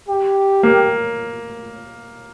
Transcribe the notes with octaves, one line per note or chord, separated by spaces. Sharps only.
G4
A#3